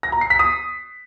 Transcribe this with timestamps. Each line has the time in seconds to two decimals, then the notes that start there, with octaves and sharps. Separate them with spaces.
0.03 A#6
0.12 A#5
0.21 C7
0.30 B6
0.39 D#6